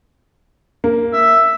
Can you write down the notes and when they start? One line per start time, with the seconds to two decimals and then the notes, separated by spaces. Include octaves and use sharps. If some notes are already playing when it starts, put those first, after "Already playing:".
0.84 A#3
1.13 E5